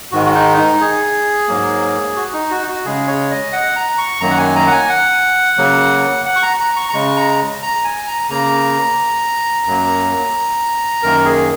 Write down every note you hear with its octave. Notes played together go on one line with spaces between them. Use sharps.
G#2 D#3 G#3 F#4
F#4
D#4
D#4
G#4
G#2 F#3 A#3
F#4
D#4
F#4
D#4
F#4
C#3 G#3 G#4
C#5
D#5
F#5
A#5
C#6
F#2 D#3 F#3 A#3 A#5
F#5
G#5
A#5
F#5
G#5
F#5
C#3 F#3 A#3
F#5
C#6
A#5
A#5
C#6
A#5
C#3 G#3 C#6
A#5
A#5
G#5
A#5
C#3 A#3 A#5
F#2 F#3 A#3
F#2 D#3 A#3 A#4
G#4